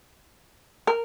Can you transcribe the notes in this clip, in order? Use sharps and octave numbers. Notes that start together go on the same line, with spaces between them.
A#4